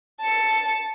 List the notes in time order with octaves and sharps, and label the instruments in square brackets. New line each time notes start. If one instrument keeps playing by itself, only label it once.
[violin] A5 C#7